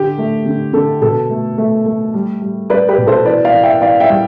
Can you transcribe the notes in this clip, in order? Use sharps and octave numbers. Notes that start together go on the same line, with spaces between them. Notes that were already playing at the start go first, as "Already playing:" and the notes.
Already playing: D3 G4
A3
D3
D3 A4
B2 A4
A3
A3
A3
G3
G3
G3 B4 D5
G4 B4
B2
A4 C5
E3 B4 D5
D5 F5
E3
E5 G5
E3 D5 F5
E5 G5
G3